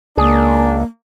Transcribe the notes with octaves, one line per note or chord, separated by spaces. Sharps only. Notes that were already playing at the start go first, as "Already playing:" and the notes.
C#2 A#3 D4 G#4